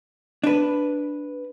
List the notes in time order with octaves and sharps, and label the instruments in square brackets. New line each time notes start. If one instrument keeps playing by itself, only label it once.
[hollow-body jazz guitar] D4 B4